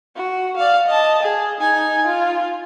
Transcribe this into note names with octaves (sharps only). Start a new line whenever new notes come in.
F#4
D5 F5
D#5 A5
G#4
D#4 G#5
F4